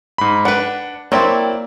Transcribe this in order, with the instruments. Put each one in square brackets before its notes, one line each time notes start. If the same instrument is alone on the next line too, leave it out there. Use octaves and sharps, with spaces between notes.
[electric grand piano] G#2 B5
[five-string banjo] D4 B4 [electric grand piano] F#5
[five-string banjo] F#3 C4 E4 [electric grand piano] A#3 D5